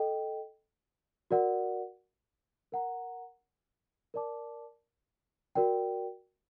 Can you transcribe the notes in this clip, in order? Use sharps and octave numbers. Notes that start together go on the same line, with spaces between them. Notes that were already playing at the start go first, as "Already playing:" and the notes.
Already playing: A4 D#5 G5
F#4 A#4 D5 F#5
A#4 F#5 A#5
A#4 D5 A5 D6
F#4 A#4 D5 G5